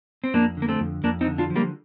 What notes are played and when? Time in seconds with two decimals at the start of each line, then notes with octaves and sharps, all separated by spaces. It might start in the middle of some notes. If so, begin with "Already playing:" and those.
0.24 C4
0.34 F2 A#3 D4
0.57 D3 A#3
0.69 A3 C4
0.80 F2
1.04 F2 A#3 D4
1.21 C4 D#4
1.27 D3
1.38 D4 F4
1.50 F3
1.56 G3 A#3